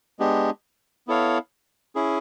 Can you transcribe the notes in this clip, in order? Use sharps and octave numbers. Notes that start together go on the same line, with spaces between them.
G#3 B3 D4 G4
B3 E4 A4 C#5 F5
C#4 E4 G#4